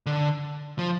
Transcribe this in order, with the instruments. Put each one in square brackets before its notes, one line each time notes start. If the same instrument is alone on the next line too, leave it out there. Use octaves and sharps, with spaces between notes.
[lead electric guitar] D3
F3